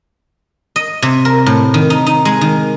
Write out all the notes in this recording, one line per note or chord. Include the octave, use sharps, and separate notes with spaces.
D#5
C3
A#4
A2
D#3
D#4
D#4
G#3
D#3